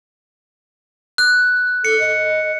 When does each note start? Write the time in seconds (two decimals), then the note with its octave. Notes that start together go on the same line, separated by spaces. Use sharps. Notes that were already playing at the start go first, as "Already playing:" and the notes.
1.18 F#6
1.85 A4 C#7
2.00 D#5